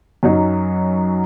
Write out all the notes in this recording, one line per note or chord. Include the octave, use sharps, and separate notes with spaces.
F#2 F#3 D#4